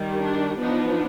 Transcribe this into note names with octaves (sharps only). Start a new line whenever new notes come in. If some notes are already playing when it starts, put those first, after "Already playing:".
Already playing: D#3 G3
D4
F3 B3 D4 D#4